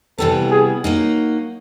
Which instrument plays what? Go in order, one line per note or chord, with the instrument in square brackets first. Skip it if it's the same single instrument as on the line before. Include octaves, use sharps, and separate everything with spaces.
[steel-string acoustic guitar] C3 E3 G3 B3 [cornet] A4
[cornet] G#4
[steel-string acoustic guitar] F#3 A#3 D#4